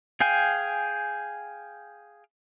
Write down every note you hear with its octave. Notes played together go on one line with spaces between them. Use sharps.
G#4 F5 G5 G#5